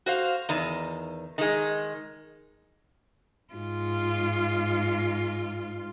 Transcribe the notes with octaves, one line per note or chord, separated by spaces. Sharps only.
F#4 C5 F5
E2 D#3
D#3 G#3
G#2 F4